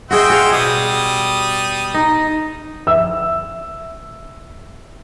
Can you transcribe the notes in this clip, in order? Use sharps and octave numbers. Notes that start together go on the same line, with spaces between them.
F#4 G#4 C5 D#5 E5 G5
F#4 G#4 F5
B2 G3 D#6
D#4
E5 E6